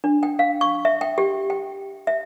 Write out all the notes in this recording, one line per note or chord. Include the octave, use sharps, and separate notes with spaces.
D4
G5
F5
C#6
E5
G5
G4
G5
E5